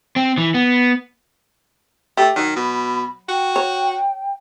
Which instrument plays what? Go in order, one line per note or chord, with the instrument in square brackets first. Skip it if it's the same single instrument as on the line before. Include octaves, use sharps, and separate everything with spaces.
[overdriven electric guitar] C4
E3
B3
[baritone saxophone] A3 [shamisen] G4
[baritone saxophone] D#3 [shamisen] F#3 [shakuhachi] D#6
[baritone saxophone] B2 [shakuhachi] B5
[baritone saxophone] F#4 [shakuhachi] G5
[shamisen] C#5